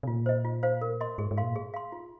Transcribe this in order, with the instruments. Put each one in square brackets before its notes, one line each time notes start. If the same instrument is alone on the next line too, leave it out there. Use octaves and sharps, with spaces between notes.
[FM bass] C3
[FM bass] A#2 [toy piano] F4
[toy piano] C5 D#5
F4
C5 F5
A#4
D#5 C6
[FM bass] G#2 [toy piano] G#4
[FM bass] G#2
[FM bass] A#2 [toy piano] F5 C6
[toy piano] G#4
F5 C6
F4